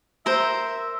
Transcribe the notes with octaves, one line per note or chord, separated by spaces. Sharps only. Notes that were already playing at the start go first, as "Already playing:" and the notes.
A#4 C5 E5